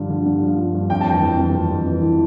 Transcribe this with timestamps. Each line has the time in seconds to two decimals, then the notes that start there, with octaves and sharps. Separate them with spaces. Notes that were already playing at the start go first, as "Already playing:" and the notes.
Already playing: G2 D3 F3
0.10 D3
0.26 G2
0.43 F3
0.58 G2
0.75 G2
0.90 F2 G5
1.01 A5
1.07 E3 G5
1.23 F2
1.39 F2
1.54 F2
1.71 F2
1.86 E3
2.03 E3